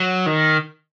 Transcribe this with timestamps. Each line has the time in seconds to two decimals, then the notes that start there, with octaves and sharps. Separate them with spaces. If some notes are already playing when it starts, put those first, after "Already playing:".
Already playing: F#3
0.26 D#3